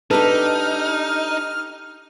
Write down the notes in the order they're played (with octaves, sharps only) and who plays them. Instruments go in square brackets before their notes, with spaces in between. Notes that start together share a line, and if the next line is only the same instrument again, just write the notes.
[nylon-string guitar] D4 B4 [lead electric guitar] D#4 [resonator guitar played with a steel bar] G4 A4 [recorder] F6